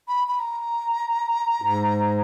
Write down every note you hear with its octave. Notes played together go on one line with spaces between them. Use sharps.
B5
B5
A#5
G#2